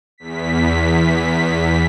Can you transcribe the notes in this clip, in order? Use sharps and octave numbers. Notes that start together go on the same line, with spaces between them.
E2 B6